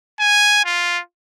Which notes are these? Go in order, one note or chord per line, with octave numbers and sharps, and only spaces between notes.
G#5
F4